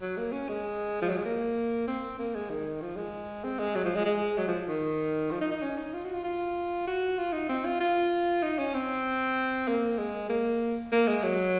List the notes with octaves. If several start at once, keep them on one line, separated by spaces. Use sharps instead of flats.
F#3
A#3
C#4
G#3
F3
F#3
G#3
A#3
C4
A#3
G#3
D#3
F3
G#3
C4
G#3
F#3
F3
G#3
G#3
F#3
F3
D#3
F3
D#4
D#4
C#4
D#4
F4
F#4
F4
F4
F#4
F4
D#4
C4
F4
F4
D#4
C#4
C4
A#3
G#3
A#3
A#3
G#3
F#3